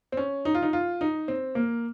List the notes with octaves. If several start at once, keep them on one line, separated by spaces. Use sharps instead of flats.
C4
C#4
D#4
F4
D#4
F4
D#4
C4
A#3